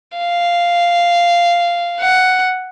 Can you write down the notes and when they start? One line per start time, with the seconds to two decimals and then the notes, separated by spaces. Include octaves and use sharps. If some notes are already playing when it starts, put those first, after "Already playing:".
0.17 F5
2.00 F#5